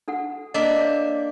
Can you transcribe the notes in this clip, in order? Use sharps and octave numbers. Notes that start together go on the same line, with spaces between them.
D4 A4 F#5
A#3 D4 D#5 E5
C#5